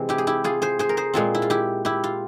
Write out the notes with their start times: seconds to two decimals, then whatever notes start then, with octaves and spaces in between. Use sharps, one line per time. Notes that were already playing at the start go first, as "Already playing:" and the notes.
Already playing: C3 E3 G#3 C4
0.09 E4 G4
0.18 G#4
0.27 E4 G4
0.44 F4 G#4
0.62 G#4 C5
0.79 G#4 C5
0.89 A#4
0.97 G#4 C5
1.14 A#2 G#3 C4 F4 G#4
1.35 E4
1.42 F4
1.50 E4 G4
1.85 E4 G4
2.04 F4